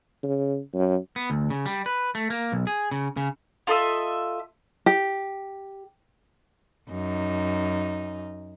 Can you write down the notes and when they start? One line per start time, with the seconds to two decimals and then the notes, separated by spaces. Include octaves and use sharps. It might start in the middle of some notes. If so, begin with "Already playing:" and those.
0.23 C#3
0.74 F#2
1.16 B3
1.30 D2
1.50 C#3
1.66 G3
1.86 B4
2.15 A3
2.30 A#3
2.52 B1
2.67 G#4
2.91 C#3
3.17 C#3
3.67 F4 A4 D#5 E5
4.86 G4
6.90 F#2 D#4